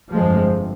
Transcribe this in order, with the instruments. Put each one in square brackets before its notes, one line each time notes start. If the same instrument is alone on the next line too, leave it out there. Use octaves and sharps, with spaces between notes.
[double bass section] G1 F2 C3 F3 G#3